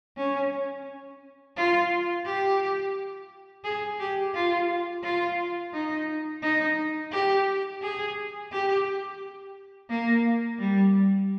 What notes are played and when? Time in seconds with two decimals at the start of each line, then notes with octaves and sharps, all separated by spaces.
0.17 C#4
1.56 F4
2.25 G4
3.64 G#4
3.99 G4
4.34 F4
5.03 F4
5.73 D#4
6.42 D#4
7.12 G4
7.82 G#4
8.51 G4
9.89 A#3
10.59 G3